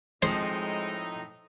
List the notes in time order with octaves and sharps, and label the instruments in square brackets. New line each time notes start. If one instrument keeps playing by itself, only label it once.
[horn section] A2 D#4 [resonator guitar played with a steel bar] F3 C4 [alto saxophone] G#3 [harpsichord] C5